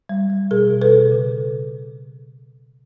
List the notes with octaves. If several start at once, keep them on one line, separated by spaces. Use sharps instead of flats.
G3
G3
B2 G#4 A#4
B2
A4 B4
B2
C#3